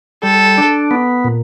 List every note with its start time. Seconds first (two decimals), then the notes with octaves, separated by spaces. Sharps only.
0.23 G3 A4
0.58 D4
0.91 B3
1.24 A#2